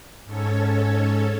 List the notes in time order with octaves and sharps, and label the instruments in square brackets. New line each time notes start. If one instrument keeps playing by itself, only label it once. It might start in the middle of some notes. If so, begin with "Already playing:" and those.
[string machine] G#2 C#4 A4 C#5